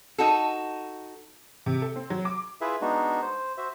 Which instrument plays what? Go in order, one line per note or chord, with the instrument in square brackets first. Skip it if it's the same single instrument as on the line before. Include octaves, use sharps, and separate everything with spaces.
[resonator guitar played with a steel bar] D#4 F#4 A4
[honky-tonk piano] C3
A4
C4
F#3
D6
[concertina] E4 F4 G#4 B4 E5
G#3 B3 D4 D#4 F#4
C5
F#4 C5 E5